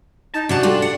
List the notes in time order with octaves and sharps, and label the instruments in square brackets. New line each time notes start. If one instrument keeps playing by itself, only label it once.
[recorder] D#4 [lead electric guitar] A5
[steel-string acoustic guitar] C3 C#4 A5 [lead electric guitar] D4 [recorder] F#4
[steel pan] G3 G4 A4 [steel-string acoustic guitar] F4 D5
[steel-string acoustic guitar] F#5